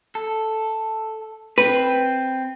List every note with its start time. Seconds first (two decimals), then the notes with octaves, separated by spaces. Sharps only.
0.15 A4
1.58 C4 B4